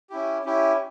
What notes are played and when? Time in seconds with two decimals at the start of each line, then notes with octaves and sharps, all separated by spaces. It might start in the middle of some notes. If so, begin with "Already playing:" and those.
0.10 C#4 E4 G4
0.45 C#4 E4 G4